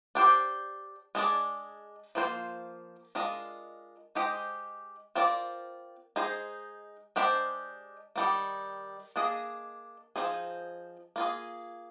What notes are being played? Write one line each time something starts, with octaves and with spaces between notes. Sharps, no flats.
D4 G4 C5
G#3 D4 G#4 D5
F3 A#3 F4 C5
G#3 D4 F4 A#4 D#5
G#3 D#4 G4 C5 D#5
C4 F4 A#4 D5
G#3 D#4 G#4 C5
G#3 D4 G4 C5
D#3 G3 A#3
A#3 D4 G#4 D#5
F3 C4 D#4 G#4
A#3 F4 G#4